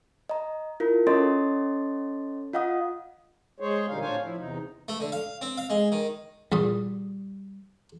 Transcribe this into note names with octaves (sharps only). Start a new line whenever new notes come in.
D#5 A#5
E4 F4 A#4
C#4 A4 C#5 D#5 C6 A6
F4 D#5 F5 F#5 D#6
G#3 G#4 C5 C#5
E2 A#2 D3 G3 D#4 F5
A2 D4 C5 C#5 F5 G#5
F3 E4
E2 C3 D#4
A3
D3
F5
C4
F5
G#3
D#3
E2 A#2 G3 D#6